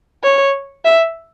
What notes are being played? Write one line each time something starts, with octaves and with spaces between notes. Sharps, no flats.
C#5
E5